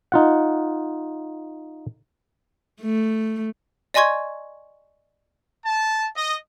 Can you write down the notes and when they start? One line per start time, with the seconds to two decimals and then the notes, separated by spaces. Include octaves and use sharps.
0.12 D#4 F4 F#5
2.81 A3
3.94 D5 D#5 G#5 C6 C#6 G#6
5.65 A5
6.15 D#5